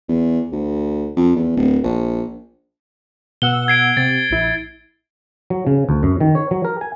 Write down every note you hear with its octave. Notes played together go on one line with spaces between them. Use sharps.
E2
D2
F2
E2
D1
A#1
B2 F#5 E6 G7
G#6 C7 D7
C3 A6
A#1 E4
F#3
C#3
D2
F#2
D#3
C#5
F#3
A#4
G#5